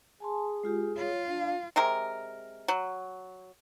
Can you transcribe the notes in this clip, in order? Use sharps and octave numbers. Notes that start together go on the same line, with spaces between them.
G#4 G#5 A5 C6
G#3 F4 G4
F4 C#5
D4 F5
C3 G#3 A#4
F#3